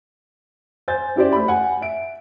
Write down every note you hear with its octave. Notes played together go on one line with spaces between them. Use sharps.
C5 G#5 G6 A6
C#4 E4 G4 C5 D5
A3 B5
F#5 G#5
E5 D7